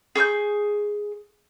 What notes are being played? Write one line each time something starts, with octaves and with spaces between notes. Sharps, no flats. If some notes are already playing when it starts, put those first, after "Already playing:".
G#4 C#6 E6 G6